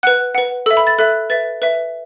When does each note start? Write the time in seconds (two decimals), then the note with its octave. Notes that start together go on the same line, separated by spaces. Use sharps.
0.03 B4 F#5 F#6
0.35 B4 F#5
0.66 A4 E5 E6
0.77 B5
0.87 A6
0.98 A4 E5 F#6
1.30 B4 E5 A6
1.62 B4 E5